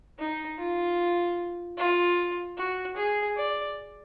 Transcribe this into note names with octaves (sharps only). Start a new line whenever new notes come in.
D#4
F4
F4
F#4
G#4
D5